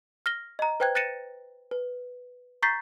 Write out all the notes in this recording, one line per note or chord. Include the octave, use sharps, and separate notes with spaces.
F6 A#6 G7
D#5 A#5
B4 C5 G5 F#6 G#6
F#6 A6 A#6 C#7 D#7 E7
B4
A#5 C#6 G6 A6 B6 C7